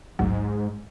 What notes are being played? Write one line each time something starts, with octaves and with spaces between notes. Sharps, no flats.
A1 D2 G#2 F#3